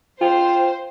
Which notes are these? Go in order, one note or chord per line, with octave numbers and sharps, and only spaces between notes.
F4 C5 G5